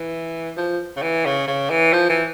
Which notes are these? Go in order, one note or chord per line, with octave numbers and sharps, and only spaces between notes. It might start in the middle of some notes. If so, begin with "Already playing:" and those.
Already playing: E3
F3
C#3
E3
C#3
C#3
E3
F3
E3